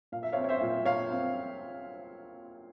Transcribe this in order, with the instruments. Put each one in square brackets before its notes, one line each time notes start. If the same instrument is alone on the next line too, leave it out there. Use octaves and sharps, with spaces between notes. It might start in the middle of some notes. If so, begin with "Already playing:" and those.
[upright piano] A#2 F5
E5
C#5 F5
C4
C#5
C5 E5
A#2
A#2 C#5 F5
C4